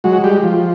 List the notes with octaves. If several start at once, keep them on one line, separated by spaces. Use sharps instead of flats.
F#3 G#3 F#4
G3 G4
F3